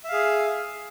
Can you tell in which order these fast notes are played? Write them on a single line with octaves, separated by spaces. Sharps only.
E5 F5 G#4